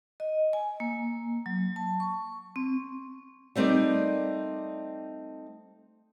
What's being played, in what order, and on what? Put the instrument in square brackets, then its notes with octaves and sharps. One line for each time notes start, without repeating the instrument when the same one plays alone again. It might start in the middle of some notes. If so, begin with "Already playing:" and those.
[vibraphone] D#5
G#5
A#3
F#3
A5
C#6
C4
[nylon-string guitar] G3 A3 C4 D#4 A#4 D5